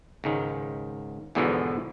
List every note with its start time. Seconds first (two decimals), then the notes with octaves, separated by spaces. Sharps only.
0.24 C#2 G#2 D#3
1.35 E2 G#2 B2 D3 E3 F3